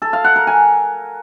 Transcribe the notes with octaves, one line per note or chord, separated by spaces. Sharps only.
A4
F5
F#5
A#4
G#5